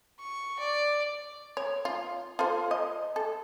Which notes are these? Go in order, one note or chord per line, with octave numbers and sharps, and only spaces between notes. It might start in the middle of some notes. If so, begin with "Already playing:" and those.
C#6
D5
C#5
F4
F4 A4 C5
D#5
A4